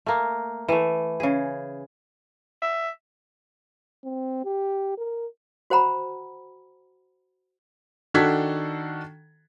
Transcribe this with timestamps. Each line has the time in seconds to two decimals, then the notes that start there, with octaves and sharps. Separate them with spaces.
0.06 A3 A#3
0.68 E3 A3
1.20 C#3 G#4
2.62 E5
4.04 C4
4.45 G4
4.98 A#4
5.70 F#4 C5 F#5 A#5 B5
8.14 D#3 D4 F#4 A4 G#6 B6